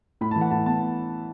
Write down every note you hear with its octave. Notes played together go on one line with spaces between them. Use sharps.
A2 B5
E3 A5
F#5
A2 A5
B3 A5